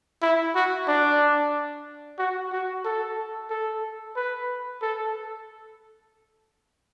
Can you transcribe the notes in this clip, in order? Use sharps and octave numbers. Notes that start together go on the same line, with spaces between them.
E4
F#4
D4
F#4
F#4
A4
A4
B4
A4